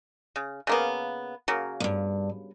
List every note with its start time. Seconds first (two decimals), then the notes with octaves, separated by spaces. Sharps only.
0.36 C#3
0.67 C#3 A#3 B3
1.48 C#3 F#3 A#3
1.80 D2 G2